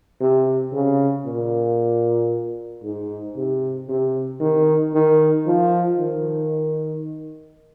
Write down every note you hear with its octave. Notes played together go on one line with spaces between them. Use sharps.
C3
C#3
A#2
G#2
C3
C3
D#3
D#3
F3
D#3